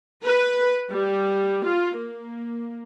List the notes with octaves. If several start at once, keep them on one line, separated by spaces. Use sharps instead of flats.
B4
G3
F4
A#3